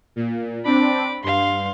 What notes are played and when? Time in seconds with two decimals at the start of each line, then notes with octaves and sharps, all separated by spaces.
0.16 A#2
0.65 C4 D4 B5 D6
1.24 G2 F5 C6